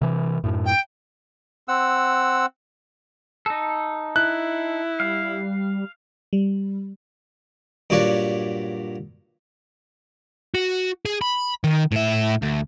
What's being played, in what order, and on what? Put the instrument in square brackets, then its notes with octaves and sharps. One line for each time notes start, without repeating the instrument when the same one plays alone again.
[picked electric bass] C3 E3
F#2 A2
[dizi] G5
[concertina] C4 F#5 E6
[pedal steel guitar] D#4 A4
[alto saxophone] E4 [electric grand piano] F#6
[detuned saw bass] G3 [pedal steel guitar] F5
[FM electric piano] G3
[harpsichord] G2 A#2 F#3 C#5 D5 F#5
[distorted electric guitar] F#4
G#4
B5
D#3
A2 E5
D2